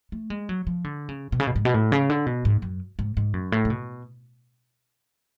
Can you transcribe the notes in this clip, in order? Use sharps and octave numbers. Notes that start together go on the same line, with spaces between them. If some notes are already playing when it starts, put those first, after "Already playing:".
A3
G#3
F#3
F3
D3
C#3
B2
C#3
B2
G#2
B2
A2
C#3
D3
B2
G#2
F#2
G#2
G#2
F#2
A2
C#3
B2